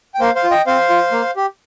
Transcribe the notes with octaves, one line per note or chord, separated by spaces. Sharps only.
G5
A#3 C5 F5
C5 F5
F4
D#5 G5
C4 C5 F5
F4
A#3
G4